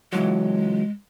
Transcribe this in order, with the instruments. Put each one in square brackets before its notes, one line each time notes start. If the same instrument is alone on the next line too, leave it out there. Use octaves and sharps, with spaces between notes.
[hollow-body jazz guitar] C#2 E3 F#3 [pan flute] G#3